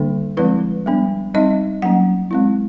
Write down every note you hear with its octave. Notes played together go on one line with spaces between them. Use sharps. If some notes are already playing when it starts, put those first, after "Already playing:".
Already playing: D3 G3 A#3 D4 A4
F3 G#3 C4 E4 B4
G3 B3 D4
G3 C4 D#4 D#5
F#3 A#3 C#4 F#5
G#3 C4 E4